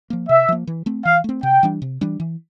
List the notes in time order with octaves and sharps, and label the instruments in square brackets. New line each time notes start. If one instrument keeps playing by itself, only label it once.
[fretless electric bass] F3 A#3
[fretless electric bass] C3 [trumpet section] E5
[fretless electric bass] F3 A#3
E3
A3 C4
[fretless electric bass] E3 [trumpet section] F5
[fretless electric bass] A3 C4
[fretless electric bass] C3 [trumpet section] G5
[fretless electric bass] E3 G3 D4
C3
E3 G3 D4
E3